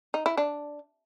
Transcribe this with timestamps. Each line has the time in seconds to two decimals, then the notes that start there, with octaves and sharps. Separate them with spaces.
0.14 D#4
0.26 E4
0.37 D4